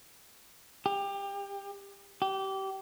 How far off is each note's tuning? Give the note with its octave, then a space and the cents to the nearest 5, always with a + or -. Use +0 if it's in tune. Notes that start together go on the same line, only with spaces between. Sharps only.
G4 +25
G4 -25